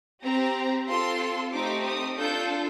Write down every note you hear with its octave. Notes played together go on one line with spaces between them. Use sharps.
C4 G4 A#5
C4 F4 A4 C6
A3 C4 D#4 G4 D6
D#6
D4 F4 A4 G6